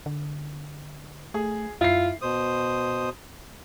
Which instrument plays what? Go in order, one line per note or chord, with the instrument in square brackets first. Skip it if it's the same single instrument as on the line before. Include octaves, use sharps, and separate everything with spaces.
[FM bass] D3
[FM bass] A3 [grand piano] G#4
[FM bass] F#2 [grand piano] E4 C7 [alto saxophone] F4
[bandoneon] B2 C5 D#6